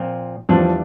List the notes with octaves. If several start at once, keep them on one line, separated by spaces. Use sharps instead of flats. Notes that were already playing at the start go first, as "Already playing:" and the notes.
Already playing: A#2 F3 C4 F4
E2 E3 F3 G3 D4 F4